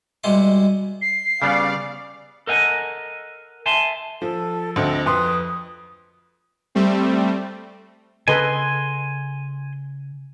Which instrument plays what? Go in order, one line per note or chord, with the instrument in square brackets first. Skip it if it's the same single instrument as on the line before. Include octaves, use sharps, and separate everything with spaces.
[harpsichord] B2 G3 G#3 E4 C6
[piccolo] C7
[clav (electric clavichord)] C#3 G3 B3 [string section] D5 F5
[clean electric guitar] A4 A#4 D#5 F5 F#5 G#5
E5 G#5 A5 C6
[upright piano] F3 [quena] A4
[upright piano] D2 C4 A4 [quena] D#5
[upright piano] F2 B4 C6 [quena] D#6
[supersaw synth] G3 A3 C4
[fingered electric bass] C#3 [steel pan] A4 B4 D#5 [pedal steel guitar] G#5 C6